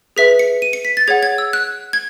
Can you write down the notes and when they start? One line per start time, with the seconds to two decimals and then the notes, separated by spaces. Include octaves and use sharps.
0.17 G#4 B4 E5 B6
0.39 C#7
0.62 D#7
0.73 C#7
0.85 B6
0.97 A6
1.08 G#4 C#5 F#5 G#6
1.23 G#6
1.38 E6
1.53 F#6
1.93 G#6